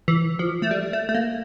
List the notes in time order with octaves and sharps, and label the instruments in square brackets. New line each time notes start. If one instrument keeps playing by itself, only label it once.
[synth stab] E3
F3
A3
G3
A3
A3
A#3